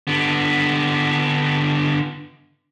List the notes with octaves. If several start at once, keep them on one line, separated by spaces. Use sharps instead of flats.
D3 B3